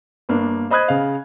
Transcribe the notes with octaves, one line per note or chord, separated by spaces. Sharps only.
G1 A#3 D4
C5 D#5 B5 D#6 F#6 G#6
C#3 F5